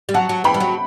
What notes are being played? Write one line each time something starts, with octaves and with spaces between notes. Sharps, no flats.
G3
F#3 F#5 A5
F#3
E3 G5 B5
G3
F#3